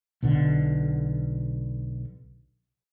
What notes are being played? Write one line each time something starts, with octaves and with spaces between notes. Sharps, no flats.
B1 B2 D3